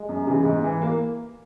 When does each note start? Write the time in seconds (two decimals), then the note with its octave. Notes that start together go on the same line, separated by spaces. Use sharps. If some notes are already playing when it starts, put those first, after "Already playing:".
Already playing: G#3
0.09 F#2
0.27 C#3 E3
0.45 G#2
0.64 E3
0.82 A#3